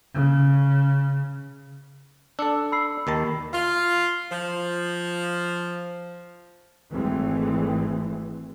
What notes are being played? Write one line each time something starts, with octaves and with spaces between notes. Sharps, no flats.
C#3
D4 A4 E6 C#7
B5 E6 C7
D#2 D#3 A5
F4
F3
G#1 E3 G#3 A3 C4